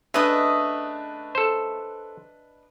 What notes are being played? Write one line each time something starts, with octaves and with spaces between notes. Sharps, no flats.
C#3 A3 D4 B4 D#5 E5 D#6
A4 C5